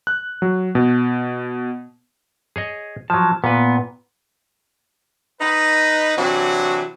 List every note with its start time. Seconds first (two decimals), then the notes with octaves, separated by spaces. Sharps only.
0.07 F#6
0.42 F#3
0.75 B2
2.56 G#4 C#5 D#5
3.10 F3 F#3 A5
3.44 A#2 B3 B4
5.40 D#4 B4
6.18 C3 E3 F#3 D4 F#4